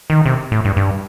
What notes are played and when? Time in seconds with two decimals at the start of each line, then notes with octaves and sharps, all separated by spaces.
0.10 D#3
0.26 C3
0.52 A2
0.65 G2
0.77 G2